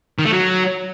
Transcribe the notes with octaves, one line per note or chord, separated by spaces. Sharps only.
D#3
A3
F#3